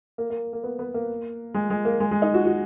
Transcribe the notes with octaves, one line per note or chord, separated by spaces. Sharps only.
A#3
A#3
A#3
B3
B3
A#3
G#3
G#3
A#3
G#3
G#3
D#4
F#4
F#4